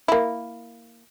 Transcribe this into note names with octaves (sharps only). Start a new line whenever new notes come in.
A#3 E4